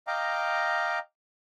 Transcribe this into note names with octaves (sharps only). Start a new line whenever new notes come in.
D#5 F5 G5 A#5 D6